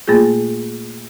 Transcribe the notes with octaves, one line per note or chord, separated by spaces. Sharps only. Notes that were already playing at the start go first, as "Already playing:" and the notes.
A#2 A3 A#3 F4 G#4